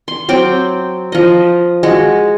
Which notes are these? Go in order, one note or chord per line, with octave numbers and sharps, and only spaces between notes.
C6
F#3 C4 G5 D6
F3 D#5
G#3 F#4